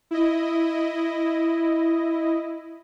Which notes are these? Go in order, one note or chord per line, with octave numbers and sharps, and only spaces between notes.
E4 D#5